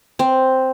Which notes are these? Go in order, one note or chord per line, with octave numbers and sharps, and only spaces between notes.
C4